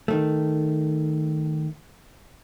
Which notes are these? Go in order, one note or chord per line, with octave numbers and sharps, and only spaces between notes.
D#3 A3